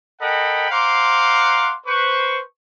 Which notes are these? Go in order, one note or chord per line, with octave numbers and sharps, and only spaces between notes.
A4 A#4 D#5 F#5 G5 B5
C5 F5 F#5 A#5 C6 D6
B4 C5 C#6